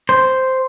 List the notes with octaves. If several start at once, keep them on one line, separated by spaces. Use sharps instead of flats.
C5